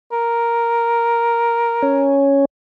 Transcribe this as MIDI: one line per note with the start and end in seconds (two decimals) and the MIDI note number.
0.12 2.19 70
1.82 2.45 61